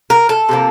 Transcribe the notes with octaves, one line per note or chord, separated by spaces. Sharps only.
A#4
A4
C3 F3 A#3